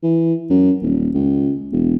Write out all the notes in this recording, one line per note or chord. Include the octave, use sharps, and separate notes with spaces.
E3
F#2
D#1
C#2
E1